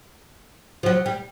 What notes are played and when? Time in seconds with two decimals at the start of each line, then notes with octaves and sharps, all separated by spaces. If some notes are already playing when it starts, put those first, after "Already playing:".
0.83 F3
0.86 F#3
1.06 G3